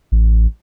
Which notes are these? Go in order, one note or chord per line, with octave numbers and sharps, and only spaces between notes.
A1